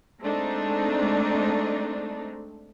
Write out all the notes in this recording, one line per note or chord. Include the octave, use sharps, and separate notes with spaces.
G#3 A3 C4 D4 D#4